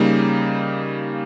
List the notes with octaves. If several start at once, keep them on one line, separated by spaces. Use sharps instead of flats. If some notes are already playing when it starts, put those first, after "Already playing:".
Already playing: C#3 G3 A#3 D#4